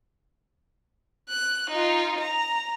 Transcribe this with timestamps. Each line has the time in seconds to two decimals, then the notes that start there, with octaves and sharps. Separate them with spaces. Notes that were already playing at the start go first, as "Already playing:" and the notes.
1.29 F#6
1.70 D#4 F4
2.21 A#5